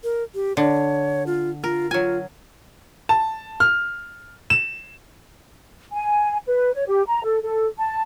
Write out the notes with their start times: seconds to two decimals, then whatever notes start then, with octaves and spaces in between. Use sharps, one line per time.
0.04 A#4
0.35 G4
0.57 D3 C#5
1.27 F4
1.64 F4 A#4
1.91 F#3 F4 G#5
3.09 A5
3.60 F6
4.50 E7
5.93 G#5
6.47 B4
6.74 C#5
6.88 G4
7.08 A#5
7.24 A4
7.43 A4
7.78 A5